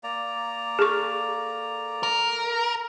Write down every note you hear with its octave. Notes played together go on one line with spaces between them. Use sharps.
A#3 D5 A#5
G#4 A4 C#6
A#4